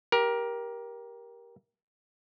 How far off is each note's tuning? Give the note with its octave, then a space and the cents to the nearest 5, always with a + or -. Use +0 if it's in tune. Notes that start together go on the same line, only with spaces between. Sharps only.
G4 +0 A#4 +20